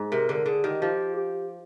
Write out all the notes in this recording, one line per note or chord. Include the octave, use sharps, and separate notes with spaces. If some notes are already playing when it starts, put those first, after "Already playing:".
Already playing: G#2
C3 A#4
D3 A#4
D3 G#4
D#3 G4
F3 G4
G4